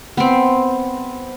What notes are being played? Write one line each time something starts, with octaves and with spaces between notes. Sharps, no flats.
B3 C4